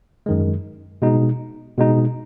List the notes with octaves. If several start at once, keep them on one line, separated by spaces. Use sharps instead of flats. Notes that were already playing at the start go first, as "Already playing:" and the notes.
F#2 D#3 G#3
B2 G#3 D#4
B2 G#3 D#4